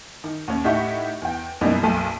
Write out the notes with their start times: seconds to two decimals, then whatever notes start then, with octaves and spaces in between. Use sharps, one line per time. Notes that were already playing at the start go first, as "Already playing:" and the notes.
0.24 D#3
0.48 D#2 C#4
0.64 A2 D#4 G4 E5 F#5 C#6
1.22 E2 G5
1.61 F#2 B2 E3 G3 A#3 D#4
1.83 F#1 B1 A4 A5 D#7